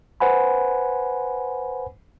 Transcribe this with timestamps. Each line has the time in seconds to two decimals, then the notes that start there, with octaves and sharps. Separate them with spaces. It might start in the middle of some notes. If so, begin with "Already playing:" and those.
0.20 B4 C5 F#5 G#5 B5